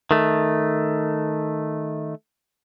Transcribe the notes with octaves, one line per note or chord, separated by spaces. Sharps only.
D#3 A3